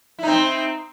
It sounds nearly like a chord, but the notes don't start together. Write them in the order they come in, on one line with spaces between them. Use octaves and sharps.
E4 D#4 C4